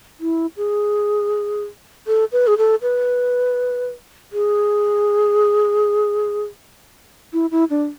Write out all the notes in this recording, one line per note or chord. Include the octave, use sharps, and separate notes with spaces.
E4
G#4
A4
B4
G#4
A4
B4
G#4
E4
E4
D4